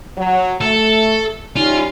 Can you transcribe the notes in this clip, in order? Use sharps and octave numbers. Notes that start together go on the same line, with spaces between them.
F#3
A3 A4
G3 C#4 D#4 F4